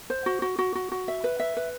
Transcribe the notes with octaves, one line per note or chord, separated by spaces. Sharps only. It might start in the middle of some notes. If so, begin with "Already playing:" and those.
C5
F#4
F#4
F#4
F#4
F#4
E5
B4
E5
B4